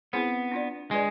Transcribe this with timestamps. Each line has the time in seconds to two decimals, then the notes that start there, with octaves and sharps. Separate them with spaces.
0.13 B3 C4 E4 G#4 C5
0.52 D4 F4 B4 D5
0.91 G#3 D4 F4 B4 D5